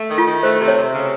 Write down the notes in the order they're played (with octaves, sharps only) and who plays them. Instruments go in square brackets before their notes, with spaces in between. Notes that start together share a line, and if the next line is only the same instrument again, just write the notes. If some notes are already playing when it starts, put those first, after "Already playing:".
Already playing: [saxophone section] A3
D#3
[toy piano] F4
[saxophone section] D#3
[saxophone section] A3 [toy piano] C5
[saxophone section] C3
[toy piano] C#5
[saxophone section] C3
C#3